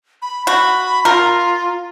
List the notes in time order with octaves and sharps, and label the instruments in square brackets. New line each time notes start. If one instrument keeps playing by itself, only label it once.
[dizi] B5
[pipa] F#4 [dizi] B5
[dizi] F4 [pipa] A#4